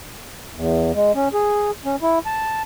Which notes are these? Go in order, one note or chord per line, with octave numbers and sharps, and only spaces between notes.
E2
G#3
C#4
G#4
C#4
E4
A5